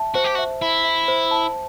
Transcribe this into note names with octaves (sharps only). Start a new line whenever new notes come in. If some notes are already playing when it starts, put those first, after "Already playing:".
Already playing: E5 A5
F#4 C5
G4
F#4
E5
E4 E5
E5
C5
A5